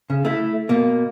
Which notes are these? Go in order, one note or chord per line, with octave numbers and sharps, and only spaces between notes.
C#3
A3 E4
B2 A#3